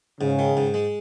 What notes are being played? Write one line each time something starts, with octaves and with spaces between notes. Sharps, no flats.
G#2 C#3
D#3
G#2
G#3